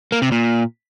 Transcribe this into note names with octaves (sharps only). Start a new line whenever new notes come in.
A#3
C3
A#2